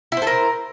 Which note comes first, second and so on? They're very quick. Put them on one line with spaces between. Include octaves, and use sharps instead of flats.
E4 C5 A4 A#4